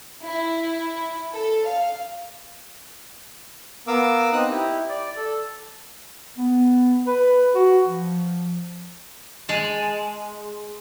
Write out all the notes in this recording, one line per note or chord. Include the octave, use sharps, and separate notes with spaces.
E4
A4
F5
B3 A#4 F5 D6 E6
C4 D#4 D#6 F#6
E4 G4
D5
A4
B3
B4
F#4
F3
G#3 G#4 A5